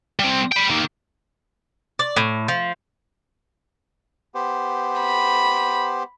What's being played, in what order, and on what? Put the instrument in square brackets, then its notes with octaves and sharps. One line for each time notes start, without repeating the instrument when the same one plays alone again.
[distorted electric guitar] G3 C4
G5 B5
D#3 A#3
[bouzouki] D5
A2
F3
[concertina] B3 G4 C5
[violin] B5